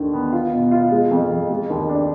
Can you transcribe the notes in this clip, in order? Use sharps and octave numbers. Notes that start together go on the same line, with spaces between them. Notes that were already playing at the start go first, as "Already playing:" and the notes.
Already playing: D#2 D3 D#3
B3
F4
B2
F4
G#3
F2
F2
G#3
D#2
D4